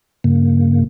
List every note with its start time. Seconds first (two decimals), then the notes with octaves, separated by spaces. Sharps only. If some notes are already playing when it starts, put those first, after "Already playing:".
0.24 G2 C#3 A#3